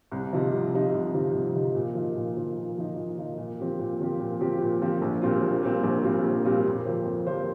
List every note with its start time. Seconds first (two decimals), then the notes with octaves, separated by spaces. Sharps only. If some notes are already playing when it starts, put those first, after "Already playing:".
0.12 C2
0.33 C3 F3 D#4
0.52 C2
0.73 C3 F3 D#4
0.94 C2
1.14 C3 F3 D#4
1.34 C2
1.55 C3 F3 D#4
1.75 A#2
1.95 F3 D#4
2.16 A#2
2.37 F3 D#4
2.57 A#2
2.78 F3 D#4
2.98 A#2
3.18 F3 D#4
3.38 A#2
3.59 F3 C4 G4
3.79 A#2
4.00 F3 C4 G4
4.20 A#2
4.40 F3 C4 G4
4.61 A#2
4.82 F3 C4 G4
5.01 A#1
5.22 A#2 G3 C4 F4
5.43 A#1
5.63 A#2 G3 C4 F4
5.83 A#1
6.04 A#2 G3 C4 F4
6.24 A#1
6.44 A#2 G3 C4 F4
6.66 F2
6.85 F3 A#3 G4 C5
7.06 F2
7.27 F3 A#3 G4 C5